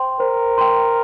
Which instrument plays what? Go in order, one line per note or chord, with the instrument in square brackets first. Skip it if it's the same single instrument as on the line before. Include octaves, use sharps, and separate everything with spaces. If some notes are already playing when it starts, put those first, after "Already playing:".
Already playing: [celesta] C5 G5 C6
[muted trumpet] A#4 [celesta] C5
[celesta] G5 C6